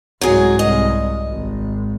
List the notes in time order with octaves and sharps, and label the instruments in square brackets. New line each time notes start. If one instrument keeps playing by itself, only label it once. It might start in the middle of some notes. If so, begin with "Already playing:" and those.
[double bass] C2 G#2 [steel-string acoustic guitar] F#3 G#4
[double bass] C2 [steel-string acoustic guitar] D#5
[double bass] G#1